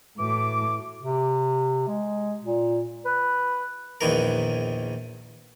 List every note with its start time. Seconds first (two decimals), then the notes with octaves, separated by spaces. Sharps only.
0.18 A2 E3 F#4 D6
1.02 C3
1.88 G#3
2.44 A#2
3.05 B4
4.01 A#1 E2 D#3 E3 A#4